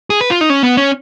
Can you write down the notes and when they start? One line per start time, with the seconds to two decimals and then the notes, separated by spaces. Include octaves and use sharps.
0.10 G#4
0.21 B4
0.31 F4
0.41 D#4
0.50 C#4
0.63 B3
0.77 C#4